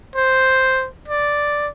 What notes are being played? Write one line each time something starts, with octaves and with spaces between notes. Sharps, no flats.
C5
D5